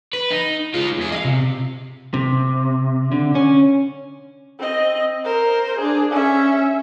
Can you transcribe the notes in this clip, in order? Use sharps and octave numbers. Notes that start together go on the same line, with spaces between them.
B4
D#4
G#3 F4
E2 G#4
D#5 F5
C3
C3
D3
C#4
C4 D#5
A#4 C5
D4 G#4
C#4 E5